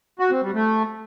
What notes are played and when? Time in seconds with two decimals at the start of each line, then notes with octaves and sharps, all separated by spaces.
0.19 F#4
0.31 C4
0.42 G3
0.54 A3